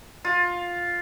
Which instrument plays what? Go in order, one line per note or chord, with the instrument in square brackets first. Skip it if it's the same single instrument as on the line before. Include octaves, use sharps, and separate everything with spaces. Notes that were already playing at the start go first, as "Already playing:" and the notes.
[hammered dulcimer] F4